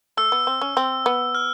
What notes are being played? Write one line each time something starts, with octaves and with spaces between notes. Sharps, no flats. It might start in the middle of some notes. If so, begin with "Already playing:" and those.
A3 E6
B3
C4
C#4
C4
B3
F6